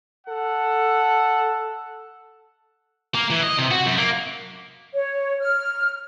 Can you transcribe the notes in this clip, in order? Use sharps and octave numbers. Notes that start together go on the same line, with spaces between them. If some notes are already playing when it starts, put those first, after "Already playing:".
A4 F#5
A#3
E3
D#5
C3
F#4
F#2
A#3
C#5
F6